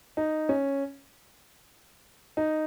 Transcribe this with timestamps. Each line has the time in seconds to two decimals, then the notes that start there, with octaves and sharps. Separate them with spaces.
0.17 D#4
0.49 C#4
2.37 D#4